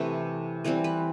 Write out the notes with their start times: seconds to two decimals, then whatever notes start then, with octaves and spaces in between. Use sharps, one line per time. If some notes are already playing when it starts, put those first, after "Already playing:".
Already playing: C3 E3 A3 B4
0.64 E3 G3 C4 B4
0.84 B4